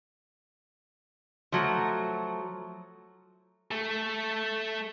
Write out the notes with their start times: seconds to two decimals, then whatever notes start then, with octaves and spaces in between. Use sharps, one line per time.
1.52 F3 F#3 A3
3.71 A3 A4